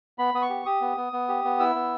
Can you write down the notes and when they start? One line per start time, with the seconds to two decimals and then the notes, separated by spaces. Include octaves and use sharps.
0.19 B3 B5
0.34 B3 D#6
0.42 C#6
0.50 G4
0.66 G4 D#6
0.81 B3
0.97 B3
1.13 B3
1.29 G4
1.44 B3
1.60 E4 E6
1.75 B3